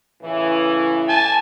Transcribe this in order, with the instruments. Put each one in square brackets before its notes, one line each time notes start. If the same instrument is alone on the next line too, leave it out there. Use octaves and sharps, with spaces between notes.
[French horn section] A2 C#3 E3
[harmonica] G#5 A5